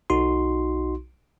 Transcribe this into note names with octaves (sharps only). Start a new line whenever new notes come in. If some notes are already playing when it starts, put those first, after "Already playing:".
B1 D#4 F#4 C6